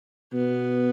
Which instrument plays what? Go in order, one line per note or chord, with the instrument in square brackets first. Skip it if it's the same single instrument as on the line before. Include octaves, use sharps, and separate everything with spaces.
[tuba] B2 [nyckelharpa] B3